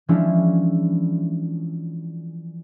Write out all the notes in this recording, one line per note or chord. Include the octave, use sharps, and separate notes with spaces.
E3 F3 G#3 C#4 D4 E4